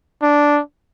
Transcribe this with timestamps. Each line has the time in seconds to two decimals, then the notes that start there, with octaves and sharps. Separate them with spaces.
0.22 D4